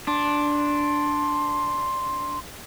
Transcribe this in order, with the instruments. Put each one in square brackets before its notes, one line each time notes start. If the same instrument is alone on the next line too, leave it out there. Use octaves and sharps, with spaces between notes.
[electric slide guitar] D4 [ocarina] C6